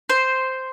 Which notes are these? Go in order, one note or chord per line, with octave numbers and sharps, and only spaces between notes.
C5